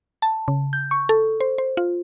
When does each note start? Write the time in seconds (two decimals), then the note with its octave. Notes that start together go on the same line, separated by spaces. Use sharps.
0.22 A5
0.48 C#3
0.73 G6
0.91 C#6
1.09 A4
1.40 C5
1.58 C5
1.77 F4